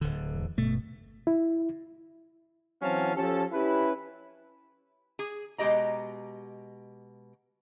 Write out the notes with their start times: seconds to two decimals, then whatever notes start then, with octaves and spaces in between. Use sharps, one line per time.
0.01 D1 D3
0.34 E2
0.58 G1 B2 A3
1.27 E4
2.82 E3 F#3 C4 C#4 F5 A5
3.15 F3 C#4 G4 A4
3.52 C#4 E4 G4 B4
5.19 G#4
5.58 B2 G#3 A3 G4 D#5 A#5